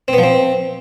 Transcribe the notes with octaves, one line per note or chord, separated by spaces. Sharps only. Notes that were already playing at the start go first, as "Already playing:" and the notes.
C4
B3
F3
C4